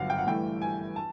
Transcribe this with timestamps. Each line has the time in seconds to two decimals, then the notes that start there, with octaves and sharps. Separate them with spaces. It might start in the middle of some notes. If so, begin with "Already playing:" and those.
Already playing: G1 F#2 D3 F5 F#5
0.10 G5
0.18 F#5
0.27 G2 E3 A3 G5
0.62 G#5
0.96 A5